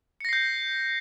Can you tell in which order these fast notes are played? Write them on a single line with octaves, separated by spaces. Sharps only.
C#7 A#6 C7 G6